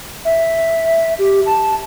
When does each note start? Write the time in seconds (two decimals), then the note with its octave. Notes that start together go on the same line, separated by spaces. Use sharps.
0.25 E5
1.19 G4
1.46 A5